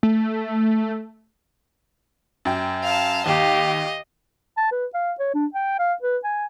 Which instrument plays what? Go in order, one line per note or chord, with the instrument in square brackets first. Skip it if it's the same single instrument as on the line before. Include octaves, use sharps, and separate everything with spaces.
[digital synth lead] A3
[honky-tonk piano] F#2 G5
[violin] F5 A5
[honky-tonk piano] D#2 [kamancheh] G4 F5 [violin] D#5
[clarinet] A5
B4
F5
C#5
D4
G5
F5
B4
G#5